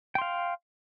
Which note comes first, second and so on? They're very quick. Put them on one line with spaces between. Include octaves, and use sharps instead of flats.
G5 C6 F5